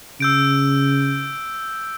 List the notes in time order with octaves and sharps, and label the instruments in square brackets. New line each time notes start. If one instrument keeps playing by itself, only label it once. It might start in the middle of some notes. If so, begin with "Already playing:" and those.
[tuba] C#3 [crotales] E6 G6 D7